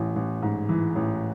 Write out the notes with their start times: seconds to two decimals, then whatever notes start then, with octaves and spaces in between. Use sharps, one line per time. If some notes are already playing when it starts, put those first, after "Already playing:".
Already playing: A1 E3
0.16 A1
0.42 G#2
0.69 E3
0.96 A1